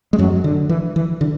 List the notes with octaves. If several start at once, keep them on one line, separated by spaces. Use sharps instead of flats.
G#3
F#2 F#3
D3
E3
E3
D3